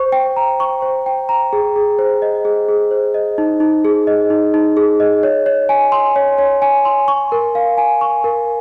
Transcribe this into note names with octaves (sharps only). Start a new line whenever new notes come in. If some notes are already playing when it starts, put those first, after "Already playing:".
Already playing: C5 C#6
G5
A#5
C#6
C5
G5
A#5
G#4
G#4
C5
D#5
G#4
G#4
C5
D#5
D#4
D#4
G#4
D#5
D#4
D#4
G#4
D#5
C#5
C#5
G#5
C6
C#5
C#5
G#5
C6
C#6
A#4
F5
G#5
C#6
A#4